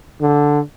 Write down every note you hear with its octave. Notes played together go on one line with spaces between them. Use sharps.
D3